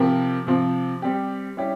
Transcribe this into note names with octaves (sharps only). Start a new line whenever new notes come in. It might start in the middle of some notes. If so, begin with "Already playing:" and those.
Already playing: C3 F3 C4 G4 A#4
C3 F3 C4
G3 C4 G4
G3 C#4 E4 G4